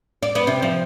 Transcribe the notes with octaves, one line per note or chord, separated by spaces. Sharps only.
D5
B3
C3
F3